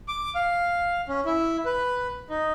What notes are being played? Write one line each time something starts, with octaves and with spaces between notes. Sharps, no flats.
D6
F5
C#4
E4
B4
D#4